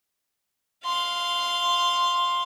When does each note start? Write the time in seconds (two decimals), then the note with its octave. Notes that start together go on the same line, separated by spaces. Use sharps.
0.85 F5 C6